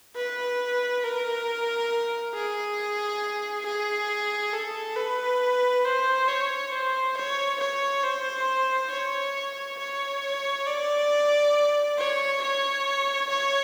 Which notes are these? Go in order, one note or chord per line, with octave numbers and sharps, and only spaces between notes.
B4
A#4
G#4
G#4
A4
B4
C5
C#5
C5
C#5
C#5
C5
C#5
C#5
D5
C#5
C#5
C#5